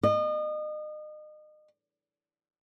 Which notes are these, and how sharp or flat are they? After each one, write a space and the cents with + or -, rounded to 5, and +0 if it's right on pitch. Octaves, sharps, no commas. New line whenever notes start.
D#5 -35